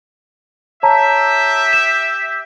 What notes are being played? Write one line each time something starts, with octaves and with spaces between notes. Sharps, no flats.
G4 C#5 E5 A5 A#5
E7